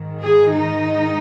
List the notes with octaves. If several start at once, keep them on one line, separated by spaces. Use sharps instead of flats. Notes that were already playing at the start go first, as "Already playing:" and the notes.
Already playing: G#2 D#3
G#4
D#4